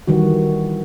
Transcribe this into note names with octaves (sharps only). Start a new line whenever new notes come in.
D#3 E3 G3 F#4